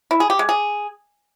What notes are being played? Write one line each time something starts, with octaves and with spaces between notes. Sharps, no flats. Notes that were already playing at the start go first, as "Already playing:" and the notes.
E4
G#4
G4
G#3
G#4